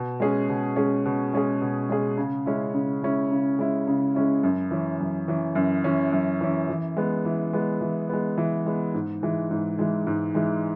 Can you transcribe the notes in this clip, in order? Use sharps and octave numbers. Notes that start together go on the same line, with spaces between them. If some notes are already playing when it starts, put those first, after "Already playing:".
Already playing: B2
G#3 C#4 G#4
B2
G#3 C#4 G#4
B2
G#3 C#4 G#4
B2
G#3 C#4 G#4
C#3
G#3 C#4 E4
C#3
G#3 C#4 E4
C#3
G#3 C#4 E4
C#3
G#3 C#4 E4
F#2
E3 C#4
F#2
E3 C#4
F#2
E3 C#4
F#2
E3 C#4
E3
G#3 B3
E3
G#3 B3
E3
G#3 B3
E3
G#3 B3
G#2
E3 G#3
G#2
E3 G#3
G#2
E3 G#3